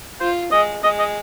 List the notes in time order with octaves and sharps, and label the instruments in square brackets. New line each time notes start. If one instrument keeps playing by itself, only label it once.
[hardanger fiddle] F4 [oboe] C5
[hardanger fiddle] G#3 [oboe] D#5
[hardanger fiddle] G#3 [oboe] D#5
[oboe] D#5